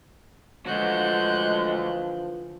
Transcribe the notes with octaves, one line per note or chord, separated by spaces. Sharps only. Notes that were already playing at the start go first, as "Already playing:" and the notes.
D3 E3 F3 G#3 A3 F#4 F#6 G6